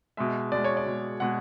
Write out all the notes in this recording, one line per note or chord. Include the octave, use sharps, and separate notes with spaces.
B2 G#3 E5
B2 G#3 D5
C#5
D5
B2 G#3
B2 G#3 F#5